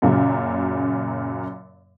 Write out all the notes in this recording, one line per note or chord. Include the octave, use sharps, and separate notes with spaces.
F#2 A#2 C#3 F#3